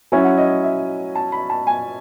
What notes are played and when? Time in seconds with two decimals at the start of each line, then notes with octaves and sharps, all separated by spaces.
0.12 F#3 C#4 E4 G#5
0.24 F#5
0.38 D#5
0.63 E5
1.15 A5
1.32 B5
1.50 A5
1.67 G#5